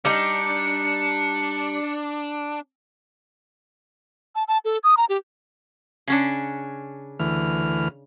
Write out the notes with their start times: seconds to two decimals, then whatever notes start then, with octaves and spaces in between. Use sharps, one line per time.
0.05 G3 D4 D#4 C#7
4.35 A5
4.48 A5
4.65 A4
4.84 D#6
4.97 A#5
5.09 G4
6.07 C#3 C#4 D4
7.19 D2 E3 F6